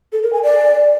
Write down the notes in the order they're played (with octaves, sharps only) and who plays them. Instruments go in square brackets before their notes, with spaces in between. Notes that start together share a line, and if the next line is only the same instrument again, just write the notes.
[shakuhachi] A4
A#4
G#5
D5